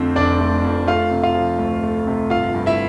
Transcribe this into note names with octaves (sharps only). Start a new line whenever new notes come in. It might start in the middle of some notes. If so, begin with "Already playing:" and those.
Already playing: F2 D3 A3 C4 C5
F1 D4 D5
A3
F2
A3 F4 F5
C3
F4 F5
F3
D2
A3
C3
G1 F4 F5
G2
E4 E5